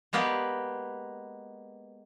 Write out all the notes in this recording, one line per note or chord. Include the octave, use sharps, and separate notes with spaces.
G#3 A#3 B3 G4 B4 D5